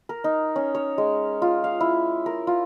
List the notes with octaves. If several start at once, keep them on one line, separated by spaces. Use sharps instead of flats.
A#4
D#4
C#4
C#5
G#3
F4
F5
E4
A#4
F4